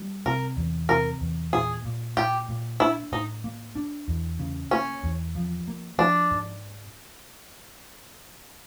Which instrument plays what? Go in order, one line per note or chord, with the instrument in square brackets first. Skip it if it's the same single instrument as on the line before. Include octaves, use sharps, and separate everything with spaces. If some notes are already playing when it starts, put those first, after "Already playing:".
Already playing: [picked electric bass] G3
[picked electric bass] C3 [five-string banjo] A#4
[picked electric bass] E2
[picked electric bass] C3 [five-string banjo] A#4
[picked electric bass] E2
[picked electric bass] A#2 [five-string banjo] G#4
[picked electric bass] A#2
[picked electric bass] A#2 [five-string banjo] G4
[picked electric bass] A#2
[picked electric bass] D4 [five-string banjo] E4
[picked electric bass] A2 [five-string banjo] D#4
[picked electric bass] A#3
D4
E2
C#3
[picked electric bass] A#3 [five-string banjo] C#4
[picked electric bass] E2
F3
A#3
[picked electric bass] F3 [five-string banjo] D4
[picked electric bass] G#2